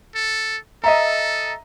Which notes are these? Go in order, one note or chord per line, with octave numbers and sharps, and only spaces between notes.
A4
A4 D#5 E5 A#5